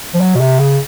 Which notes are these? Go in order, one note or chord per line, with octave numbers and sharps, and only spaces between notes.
F3
F#3
B2
C3
C#3